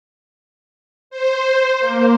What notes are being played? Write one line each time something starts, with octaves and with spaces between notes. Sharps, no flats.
C5
A#3